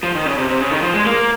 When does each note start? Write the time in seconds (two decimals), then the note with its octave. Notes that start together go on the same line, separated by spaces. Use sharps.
0.03 F3
0.15 D#3
0.26 C#3
0.38 C3
0.49 C3
0.61 C#3
0.71 D#3
0.82 F3
0.94 G#3
1.06 A#3